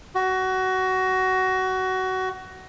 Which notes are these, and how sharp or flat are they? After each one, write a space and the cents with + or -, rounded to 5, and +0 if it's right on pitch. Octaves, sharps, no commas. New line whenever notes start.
F#4 +20